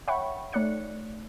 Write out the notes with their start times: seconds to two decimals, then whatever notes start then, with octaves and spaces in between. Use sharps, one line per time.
0.07 C#5 E5 F#5 G5 B5 C#6
0.53 A3 D#4 C#5 D5 F#6 C#7